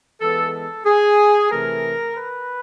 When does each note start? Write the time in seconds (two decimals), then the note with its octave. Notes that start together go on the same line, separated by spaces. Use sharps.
0.21 E3 G#3 B3 A4
0.53 A4
0.84 G#4
1.50 C3 E3 A3 A#4
2.15 B4